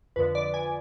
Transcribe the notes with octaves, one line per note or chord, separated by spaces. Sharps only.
F2 D3 F3 B4
D5
G#5